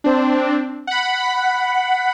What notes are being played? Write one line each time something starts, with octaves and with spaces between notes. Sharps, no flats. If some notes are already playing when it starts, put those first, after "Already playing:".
C4 D4
F#5 B5